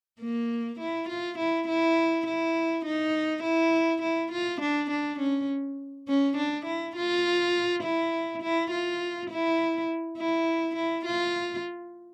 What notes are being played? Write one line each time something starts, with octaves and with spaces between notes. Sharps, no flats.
A#3
E4
F4
E4
E4
E4
D#4
E4
E4
F4
D4
D4
C#4
C#4
D4
E4
F4
E4
E4
F4
E4
E4
E4
F4